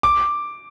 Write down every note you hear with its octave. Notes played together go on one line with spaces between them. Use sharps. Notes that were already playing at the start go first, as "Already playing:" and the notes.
D6